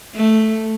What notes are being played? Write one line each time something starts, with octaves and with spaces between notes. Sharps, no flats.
A3